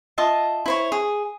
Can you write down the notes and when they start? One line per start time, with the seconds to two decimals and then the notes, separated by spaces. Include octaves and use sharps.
0.18 F4 D#5 E5 A5
0.66 E4 C5 C#5
0.92 G#4